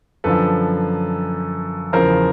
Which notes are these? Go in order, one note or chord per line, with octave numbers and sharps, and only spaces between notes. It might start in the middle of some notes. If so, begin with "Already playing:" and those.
F#2 D3 F3 A4 B4
E2 C#3 F3 A#4 C5